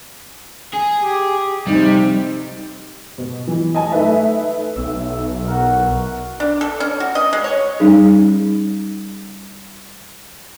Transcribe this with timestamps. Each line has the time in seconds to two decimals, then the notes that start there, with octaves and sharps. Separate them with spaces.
0.74 G#4
1.00 G4
1.67 F2 C3 G3 D#4
3.18 B2
3.47 E3
3.74 D#5 G#5 A5
3.92 A3 D#4 B4 E5
4.76 B1 E5
5.47 F#4 A#4
6.40 D4
6.61 A4
6.80 C#4
7.00 F#4
7.15 D#5
7.33 G#3
7.44 C#5
7.80 G3 C#4 D#4 G#4